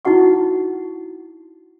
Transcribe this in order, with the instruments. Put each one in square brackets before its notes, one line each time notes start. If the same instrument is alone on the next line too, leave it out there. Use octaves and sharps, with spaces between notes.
[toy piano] D#4 E4 F#4 F#5 C#6